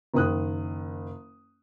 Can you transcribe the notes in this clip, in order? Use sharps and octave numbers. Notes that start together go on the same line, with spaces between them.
F#1 D#3 D#6 F#6